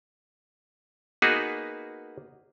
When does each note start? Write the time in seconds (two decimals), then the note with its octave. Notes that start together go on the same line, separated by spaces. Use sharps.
1.22 A#3 B3 D#4 F#4 G#4 B4